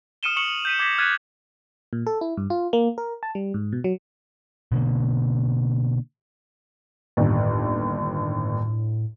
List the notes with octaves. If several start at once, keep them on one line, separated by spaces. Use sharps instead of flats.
D#6 F6 C#7 D#7 E7 G7
C#6 D#6 C#7 F7 F#7
G6 B6 D#7
D6 G#6 A#6 B6 G7
F6 F#6 G#6 A6 B6 D#7
A#2
A4
E4
G2
F4
A#3
A#4
A5
G3
G#2
B2
F#3
B2 D3 A#3
G1 D#2 A2